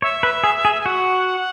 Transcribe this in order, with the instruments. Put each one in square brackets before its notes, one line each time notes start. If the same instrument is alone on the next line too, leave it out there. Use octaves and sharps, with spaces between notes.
[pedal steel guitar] C#5 [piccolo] E5
[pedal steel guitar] B4
G#4
G#4
[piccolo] G#5
[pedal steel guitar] F#4 [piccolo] F#5